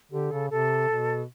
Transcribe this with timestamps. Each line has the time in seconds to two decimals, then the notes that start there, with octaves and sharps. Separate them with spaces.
0.12 D3 G4
0.31 C#3 A4
0.50 C3 A4
0.89 B2